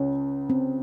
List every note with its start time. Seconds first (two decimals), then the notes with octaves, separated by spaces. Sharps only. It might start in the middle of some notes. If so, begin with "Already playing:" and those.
Already playing: C#2 C#3 C#4
0.50 C4